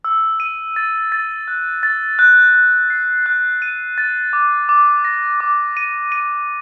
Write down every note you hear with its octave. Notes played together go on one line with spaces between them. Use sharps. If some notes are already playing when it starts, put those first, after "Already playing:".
E6
D#7
A6
A6
F#6
A6
F#6
F#6
C7
F#6
D#7
A6
D6
D6
A#6
D6
D#7
D#7